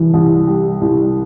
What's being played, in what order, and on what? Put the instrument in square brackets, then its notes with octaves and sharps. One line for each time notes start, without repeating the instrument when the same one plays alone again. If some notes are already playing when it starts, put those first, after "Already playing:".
Already playing: [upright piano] C2 [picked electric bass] E3
[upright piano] C2
G3
C2